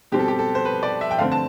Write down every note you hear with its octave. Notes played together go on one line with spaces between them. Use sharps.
B2 G3 C4 G4
A4
G4
A4
C5
B4
D5
E5
G5
D3 A3 C4 F5
A5